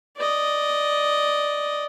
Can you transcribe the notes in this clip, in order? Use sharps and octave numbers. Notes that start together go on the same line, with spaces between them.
D5 D#5